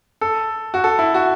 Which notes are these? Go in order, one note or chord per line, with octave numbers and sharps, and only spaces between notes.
A4
F#4
A4
E4
F#4